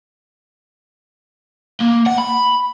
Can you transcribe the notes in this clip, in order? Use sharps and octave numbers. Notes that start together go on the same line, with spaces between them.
A#3
F#5
B5